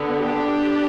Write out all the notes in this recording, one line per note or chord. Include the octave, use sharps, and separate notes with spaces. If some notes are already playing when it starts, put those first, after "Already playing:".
Already playing: D3 B3
D4 G4